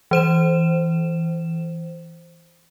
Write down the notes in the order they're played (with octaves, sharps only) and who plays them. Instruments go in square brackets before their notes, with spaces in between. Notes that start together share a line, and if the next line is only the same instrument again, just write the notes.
[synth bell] E3 C5 E7